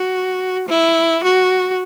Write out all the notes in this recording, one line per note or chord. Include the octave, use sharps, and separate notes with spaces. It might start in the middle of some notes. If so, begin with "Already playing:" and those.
Already playing: F#4
E4
F#4